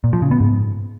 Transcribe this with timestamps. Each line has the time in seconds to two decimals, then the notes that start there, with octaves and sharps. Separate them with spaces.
0.04 A#2
0.13 F3
0.22 C#3
0.31 B3
0.40 G#2